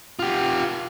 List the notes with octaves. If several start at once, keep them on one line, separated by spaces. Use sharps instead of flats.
F4 G4